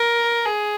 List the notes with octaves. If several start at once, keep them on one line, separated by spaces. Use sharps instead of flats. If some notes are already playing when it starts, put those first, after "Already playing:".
Already playing: A#4
G#4